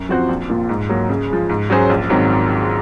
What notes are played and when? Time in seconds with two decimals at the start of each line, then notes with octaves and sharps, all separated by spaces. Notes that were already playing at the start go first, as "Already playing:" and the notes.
Already playing: F#2
0.09 F3 C4 F#4 C5
0.29 A#1
0.49 A#2 F3
0.69 G#2
0.89 F#3 A#3
1.09 C#3
1.30 F3 G#3
1.49 G#2
1.70 F#3 C#4 G#4 C5
1.90 A#1
2.10 G#2 D#3 F#3 C4